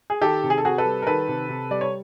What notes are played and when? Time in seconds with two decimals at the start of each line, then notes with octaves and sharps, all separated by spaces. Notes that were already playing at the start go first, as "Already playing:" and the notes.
0.10 G#4
0.21 D#3 G4 A4
0.43 C3
0.50 G#4
0.58 A4
0.64 C3 F#4 G#4
0.78 A4 B4
0.85 G3
1.02 A#4
1.07 D#3 A4 B4
1.28 C3
1.49 C3
1.71 G3 D5
1.81 C#5